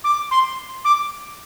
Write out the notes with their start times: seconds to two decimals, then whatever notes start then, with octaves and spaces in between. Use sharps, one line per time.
0.04 D6
0.31 C6
0.85 D6